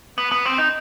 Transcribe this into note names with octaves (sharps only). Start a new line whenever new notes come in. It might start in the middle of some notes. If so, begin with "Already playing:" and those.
B3
B3
C4
D#4